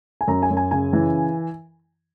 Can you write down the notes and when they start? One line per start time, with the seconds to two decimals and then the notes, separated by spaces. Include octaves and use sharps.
0.21 G#5
0.28 F#2 A#5
0.43 G#5
0.50 F#2
0.57 G#5
0.71 C#3 G#5
0.93 E3